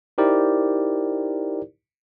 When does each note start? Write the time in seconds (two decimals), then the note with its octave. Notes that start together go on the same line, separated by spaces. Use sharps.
0.18 D#4 E4 G4 A#4 C5 D5